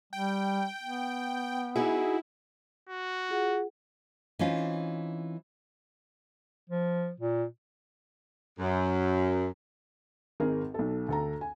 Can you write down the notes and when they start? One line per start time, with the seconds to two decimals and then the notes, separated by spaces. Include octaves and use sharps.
0.13 G3 G5
0.83 B3
1.76 D#4 E4 F#4 G#4
2.89 F#4
3.29 F4 G#4 F#5
4.39 E3 C4 C#4 D#4 F4
6.70 F3
7.20 A#2
8.59 F#2
10.40 G#1 G#3 G#4 A#4
10.74 B1 A4
11.08 D2 A4 A#5
11.41 G#5